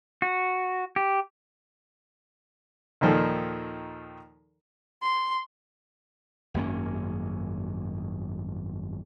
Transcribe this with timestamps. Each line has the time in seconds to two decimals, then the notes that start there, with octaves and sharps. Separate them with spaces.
0.22 F#4
0.96 G4
3.01 D#2 A#2 D#3 F3 A4
5.02 C6
6.54 G#1 F#2 A#3 C#4